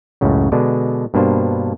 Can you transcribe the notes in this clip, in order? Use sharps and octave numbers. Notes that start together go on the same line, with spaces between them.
C#2 F#2 A2 C#3
B2 D3 G#3 D4
G2 B2 A#3 D4 C5